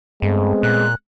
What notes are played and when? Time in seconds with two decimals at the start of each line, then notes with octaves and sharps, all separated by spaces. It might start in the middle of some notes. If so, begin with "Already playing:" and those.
0.22 G2 G#3 A3 B3 C4
0.63 A#2 F#6